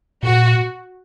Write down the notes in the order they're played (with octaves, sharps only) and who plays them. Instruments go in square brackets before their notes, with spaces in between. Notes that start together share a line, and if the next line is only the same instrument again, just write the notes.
[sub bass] A#2 [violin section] F#4